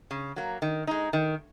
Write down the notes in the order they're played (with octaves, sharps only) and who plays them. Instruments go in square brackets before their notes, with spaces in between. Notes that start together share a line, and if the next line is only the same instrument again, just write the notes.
[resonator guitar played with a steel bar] C#3
F#3 A#3
D#3
G#3 D#4
D#3